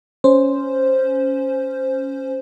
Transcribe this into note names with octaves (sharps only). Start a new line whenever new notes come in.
C#4 C5